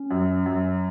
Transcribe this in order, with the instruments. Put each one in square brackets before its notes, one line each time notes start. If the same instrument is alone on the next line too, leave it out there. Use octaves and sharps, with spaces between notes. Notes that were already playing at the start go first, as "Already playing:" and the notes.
Already playing: [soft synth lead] C#4
[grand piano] F#2
F#2